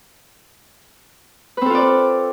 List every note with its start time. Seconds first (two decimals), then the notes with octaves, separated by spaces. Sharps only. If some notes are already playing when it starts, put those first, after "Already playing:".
1.57 B4
1.62 C4
1.66 A4
1.70 F4
1.75 D5